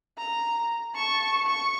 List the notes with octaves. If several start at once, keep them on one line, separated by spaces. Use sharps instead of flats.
A#5
A5 C#6
C#6